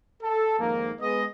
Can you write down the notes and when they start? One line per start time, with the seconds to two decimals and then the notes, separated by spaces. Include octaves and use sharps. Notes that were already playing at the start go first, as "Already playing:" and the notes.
0.23 A4
0.59 F2 G#2 D#3 F3 A#3
1.01 G#3 B3 D#5